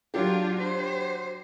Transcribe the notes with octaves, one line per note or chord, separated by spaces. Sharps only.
F#3 D4 F4 G4
C5